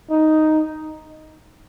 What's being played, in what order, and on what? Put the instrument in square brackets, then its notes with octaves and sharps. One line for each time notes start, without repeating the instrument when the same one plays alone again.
[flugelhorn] D#4